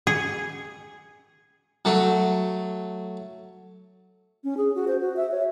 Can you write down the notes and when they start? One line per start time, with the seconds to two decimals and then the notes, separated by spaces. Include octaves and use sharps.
0.07 G#4
1.85 F#3 A3
4.44 C#4
4.57 G#4
4.75 F#4
4.88 C5
5.01 F#4
5.17 E5
5.31 C#5